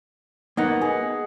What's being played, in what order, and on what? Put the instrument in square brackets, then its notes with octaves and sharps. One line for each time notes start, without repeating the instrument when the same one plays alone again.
[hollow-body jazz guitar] A#3 B3 D#4 [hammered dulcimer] D#5 F#5
[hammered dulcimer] G#4